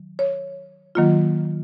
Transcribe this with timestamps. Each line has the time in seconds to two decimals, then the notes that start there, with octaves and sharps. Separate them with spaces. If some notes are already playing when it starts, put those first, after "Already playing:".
Already playing: D#3 F#3
0.19 C#5
0.95 D#3 F#3 A#3 F4